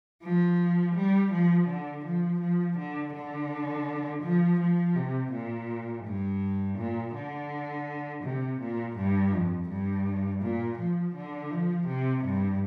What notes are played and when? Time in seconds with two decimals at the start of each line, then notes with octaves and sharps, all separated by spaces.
0.23 F3
0.95 G3
1.32 F3
1.68 D3
2.05 F3
2.40 F3
2.78 D3
3.13 D3
4.22 F3
4.60 F3
4.95 C3
5.32 A#2
6.05 G2
6.78 A#2
7.14 D3
8.23 C3
8.60 A#2
8.97 G2
9.32 F2
9.69 G2
10.42 A#2
10.78 F3
11.15 D3
11.51 F3
11.87 C3
12.24 G2